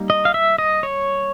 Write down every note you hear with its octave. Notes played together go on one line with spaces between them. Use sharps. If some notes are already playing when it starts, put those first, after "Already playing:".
Already playing: G3 A#3 D#4
D#5
F5
E5
D#5
C#5